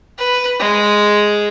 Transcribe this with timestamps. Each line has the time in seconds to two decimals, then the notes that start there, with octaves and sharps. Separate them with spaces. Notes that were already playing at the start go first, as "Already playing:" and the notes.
0.18 B4
0.60 G#3